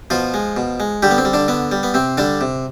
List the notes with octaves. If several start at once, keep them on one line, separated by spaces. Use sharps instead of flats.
B2 F3 F4
G#3
B2
G#3
D3 G3 G4
B3
C4
G3
D3 D4
D3 B3
G3
B3
C3 C4
D3 G3 D4
C3